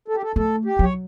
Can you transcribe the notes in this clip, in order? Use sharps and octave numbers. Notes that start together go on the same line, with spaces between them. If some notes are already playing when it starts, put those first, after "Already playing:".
A4
G4
A4
A3 A4
G4
F#3 C#5